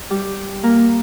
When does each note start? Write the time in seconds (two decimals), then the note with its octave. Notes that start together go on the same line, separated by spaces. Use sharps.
0.10 G3 G4
0.63 A#3 A#4